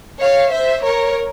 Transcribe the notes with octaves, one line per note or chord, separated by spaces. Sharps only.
C#5 F5
C5 E5
A#4 C#5